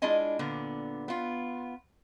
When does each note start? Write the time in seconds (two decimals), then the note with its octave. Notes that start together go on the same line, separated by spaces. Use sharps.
0.02 G#3 D4 E4 F4 D#5 G#5
0.39 A#2 D3 B3
1.08 B3 F4